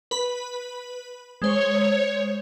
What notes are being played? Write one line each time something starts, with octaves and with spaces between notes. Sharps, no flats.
B4 B5
G#3 C5 C#5